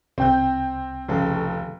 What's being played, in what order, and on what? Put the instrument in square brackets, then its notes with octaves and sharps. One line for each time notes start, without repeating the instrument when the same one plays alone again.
[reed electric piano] C2 G5 [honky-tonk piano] C4 G6
[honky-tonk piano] F1 C#3 A4